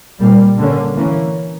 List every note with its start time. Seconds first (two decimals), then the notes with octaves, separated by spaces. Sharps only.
0.20 A#2 G3 A#3
0.59 D3 A#3 C#4
0.96 E3 A#3 C#4